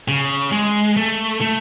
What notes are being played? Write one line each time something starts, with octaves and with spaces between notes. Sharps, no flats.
C#3
G#3
A3
A3